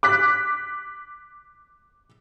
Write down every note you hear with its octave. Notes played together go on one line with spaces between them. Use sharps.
D6 F#6 B6